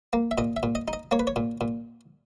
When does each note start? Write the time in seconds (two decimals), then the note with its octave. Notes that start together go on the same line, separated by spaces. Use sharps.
0.13 A#3
0.31 E5
0.38 A#2 D#5
0.56 E5
0.63 A#2
0.75 D#5
0.88 D#4
0.93 D#5
1.11 A#3 C#5
1.20 B4
1.27 C#5
1.36 A#2
1.61 A#2